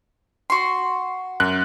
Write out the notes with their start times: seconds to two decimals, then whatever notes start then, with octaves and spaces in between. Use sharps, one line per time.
0.50 F#4 C6
1.40 F#2 F#6